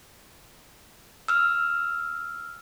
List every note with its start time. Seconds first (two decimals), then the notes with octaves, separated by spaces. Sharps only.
1.28 E6 F6